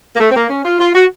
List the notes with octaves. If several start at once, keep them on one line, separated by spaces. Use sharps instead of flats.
A#3
A3
C4
A#3
C#4
F4
F4
F#4